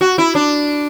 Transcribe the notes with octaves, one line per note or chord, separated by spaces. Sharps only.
F#4
E4
D4